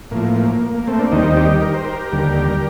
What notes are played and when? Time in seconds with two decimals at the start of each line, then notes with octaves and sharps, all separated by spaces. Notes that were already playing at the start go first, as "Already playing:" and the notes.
0.11 A2 F3 A#3
0.36 A#3
0.75 A#3
0.87 A3 C4
0.99 A#3 D4
1.11 D#2 D#3 G3 C4 D#4
1.37 D#4 G4
1.62 A#4
1.74 C5
1.85 G4 A#4
2.12 D#2 D3 G3